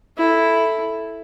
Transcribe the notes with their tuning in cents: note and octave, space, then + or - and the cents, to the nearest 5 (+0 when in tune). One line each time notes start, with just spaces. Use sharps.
E4 +0 A4 +0